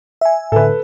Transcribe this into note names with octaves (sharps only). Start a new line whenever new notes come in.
E5 G#5
A2 D3 A4 B4